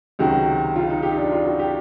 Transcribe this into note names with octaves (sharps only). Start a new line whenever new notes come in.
C#2 C3 D#3 F#3 F#4
F4
D#4
G4
D#4
D4
F4
F#4
G4